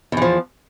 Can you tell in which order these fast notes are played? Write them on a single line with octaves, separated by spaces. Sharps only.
E2 E3 F3